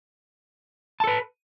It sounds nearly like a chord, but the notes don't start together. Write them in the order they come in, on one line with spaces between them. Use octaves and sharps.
A5 A4 B4